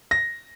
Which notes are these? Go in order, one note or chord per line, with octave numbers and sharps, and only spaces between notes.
A#6